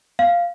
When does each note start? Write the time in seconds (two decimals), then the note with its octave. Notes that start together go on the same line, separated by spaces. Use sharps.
0.19 F5